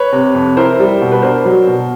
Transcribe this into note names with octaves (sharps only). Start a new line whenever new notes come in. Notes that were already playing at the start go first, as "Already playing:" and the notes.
Already playing: B4 C#5
C3
F2
E4 A#4 C5
G3
B2
B4
D4 A#4 C5
F#3
B2